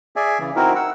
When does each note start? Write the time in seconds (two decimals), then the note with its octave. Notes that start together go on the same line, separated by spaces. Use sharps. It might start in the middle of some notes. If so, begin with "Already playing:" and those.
0.16 G#4 D5 E5 G#5
0.39 C#3 E3
0.56 C4 D#4 E4 F#4 A#4
0.76 F#5 E6